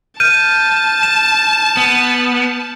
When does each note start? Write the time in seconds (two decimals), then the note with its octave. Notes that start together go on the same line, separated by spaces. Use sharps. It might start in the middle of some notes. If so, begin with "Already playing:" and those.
0.20 A5 F6 G6 D#7
1.03 E7
1.77 B3